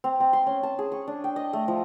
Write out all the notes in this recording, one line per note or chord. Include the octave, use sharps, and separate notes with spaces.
C4
C4
C6
C#4
A5
G#4
C#6
D4
G5
D#5
A3
F3